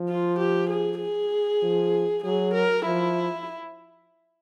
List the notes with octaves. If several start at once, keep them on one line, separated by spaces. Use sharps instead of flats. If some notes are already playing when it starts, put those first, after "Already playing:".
Already playing: F3
F4
G4
G#4
G#4
F3
F#3 G#4
A#4
F3 E4